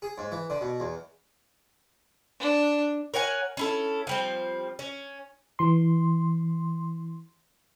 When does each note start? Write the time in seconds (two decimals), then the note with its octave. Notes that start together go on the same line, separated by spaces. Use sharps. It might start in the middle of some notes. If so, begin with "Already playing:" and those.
0.02 G#4
0.18 G#2
0.32 E3
0.50 D3
0.61 B2
0.80 E2
2.40 D4
3.14 A#4 C#5 F#5 G#5
3.57 C#4 E4 A4
4.07 F3 G3 C4
4.79 C#4
5.59 E3 C6